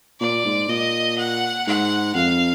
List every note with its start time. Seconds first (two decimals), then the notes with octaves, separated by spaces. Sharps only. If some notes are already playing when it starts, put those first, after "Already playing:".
0.20 A#2 D5
0.45 G#2
0.69 A#2 D#5
1.18 F#5
1.67 G#2 F#5
2.15 F2 F5